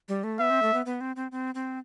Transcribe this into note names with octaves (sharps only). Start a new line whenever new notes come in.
G3
A3
B3 E5
C4
A3
B3
B3
C4
C4
C4
C4